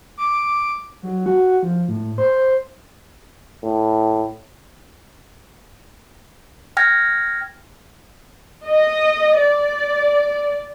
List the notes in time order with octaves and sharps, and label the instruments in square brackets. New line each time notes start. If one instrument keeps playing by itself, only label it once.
[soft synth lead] D6
F#3
F#4
F3
A2
C5
[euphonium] A2
[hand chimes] G5 F6 G#6 A#6
[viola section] D#5
D5